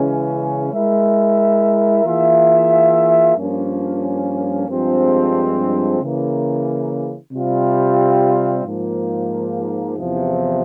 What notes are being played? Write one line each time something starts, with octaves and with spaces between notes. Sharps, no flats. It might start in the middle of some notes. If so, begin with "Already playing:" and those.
Already playing: C#3 E3 G#3 C#4
G#3 E4 A#4 E5
E3 A#3 F4 G#4 E5
G2 F3 A#3 C#4
G2 F3 G#3 C4
C#3 E3 A#3
C3 G3 C4 F4
G#2 F3 A#3
E2 C3 F3